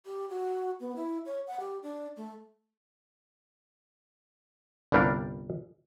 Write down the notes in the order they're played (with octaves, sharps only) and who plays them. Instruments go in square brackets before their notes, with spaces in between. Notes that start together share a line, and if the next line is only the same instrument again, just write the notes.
[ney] G4
F#4
B3
E4
C#5
F#5
G4
D4
A3
[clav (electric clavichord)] G1 C2 G2 G3 D4 A#4